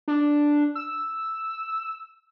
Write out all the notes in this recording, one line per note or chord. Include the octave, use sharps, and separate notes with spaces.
D4
E6